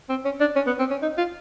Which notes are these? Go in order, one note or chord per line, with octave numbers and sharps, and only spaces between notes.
C4
C#4
D4
C#4
B3
C4
C#4
D#4
F4